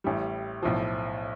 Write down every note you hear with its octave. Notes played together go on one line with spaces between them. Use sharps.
A1 A2 G3
B1 A2 F3